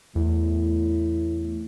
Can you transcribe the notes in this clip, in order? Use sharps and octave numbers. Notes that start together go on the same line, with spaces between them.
E2 A2